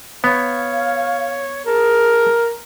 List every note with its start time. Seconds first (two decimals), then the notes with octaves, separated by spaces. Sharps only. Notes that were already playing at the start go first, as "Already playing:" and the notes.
0.24 B3 C#5 F5
1.66 G#4 A#4 A5